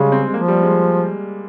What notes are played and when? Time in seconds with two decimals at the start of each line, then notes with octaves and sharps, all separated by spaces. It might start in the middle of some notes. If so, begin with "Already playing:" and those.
Already playing: C#3 G3 G#3
0.12 C4
0.28 G#3
0.33 F3 A#3
0.48 G3
0.63 G#3